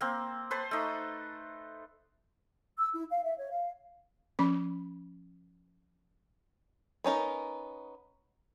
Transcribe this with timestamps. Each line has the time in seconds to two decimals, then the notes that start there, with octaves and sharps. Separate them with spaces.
0.01 A#3 C4
0.51 B4 C5 A5
0.71 A3 D#4
2.77 E6
2.93 E4
3.10 F5
3.24 E5
3.38 C#5
3.52 F5
4.39 F3 C#4 B5
7.04 B3 C#4 D#4 A#4